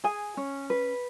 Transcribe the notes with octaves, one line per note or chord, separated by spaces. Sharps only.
G#4 G#5
C#4
B4